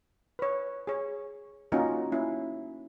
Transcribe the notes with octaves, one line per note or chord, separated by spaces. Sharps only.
B4 C#5
G#4 C#5
A#3 C#4 D#4 F4 F#4 A#4
A#3 C#4 E4